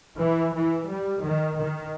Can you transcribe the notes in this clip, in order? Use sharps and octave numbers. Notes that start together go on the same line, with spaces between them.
E3
E3
G3
D#3
D#3